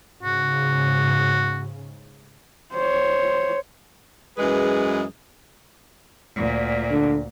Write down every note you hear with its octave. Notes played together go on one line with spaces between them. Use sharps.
G#2 C#3 F#4
C5 C#5
F#2 E3 G#3 G#4 B4
D2 A#2
D3